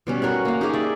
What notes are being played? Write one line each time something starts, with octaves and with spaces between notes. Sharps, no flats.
B2 G3 C#4
F#4 A#4 C#5 F#5
A#3 F5
D#4 G4 G#4 F5
D5 E5